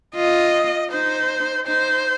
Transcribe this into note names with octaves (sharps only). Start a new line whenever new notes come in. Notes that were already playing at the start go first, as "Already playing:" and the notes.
F4 D#5
D#4 C5
D#4 C5